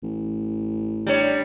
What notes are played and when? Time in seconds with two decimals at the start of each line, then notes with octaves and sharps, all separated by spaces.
0.03 A1
1.07 G3 D4 C#5